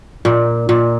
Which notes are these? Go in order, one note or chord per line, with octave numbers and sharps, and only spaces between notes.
A#2
A#2